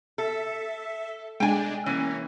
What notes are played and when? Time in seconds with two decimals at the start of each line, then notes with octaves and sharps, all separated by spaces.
0.18 A4 E5
1.40 G#3 D4 G5 G#5
1.86 E3 A#3 C#4